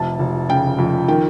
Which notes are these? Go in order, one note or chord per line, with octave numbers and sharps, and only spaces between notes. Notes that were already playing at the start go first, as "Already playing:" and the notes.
Already playing: F1 C3 A5
F1
C#3 G5
F2
D#3 G5